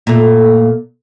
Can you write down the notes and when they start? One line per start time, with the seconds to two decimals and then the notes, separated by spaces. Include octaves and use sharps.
0.07 A#2 A3